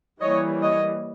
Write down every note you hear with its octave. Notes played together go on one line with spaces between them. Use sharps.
E3 G3 A#3 C#5 D#5
C#5 D#5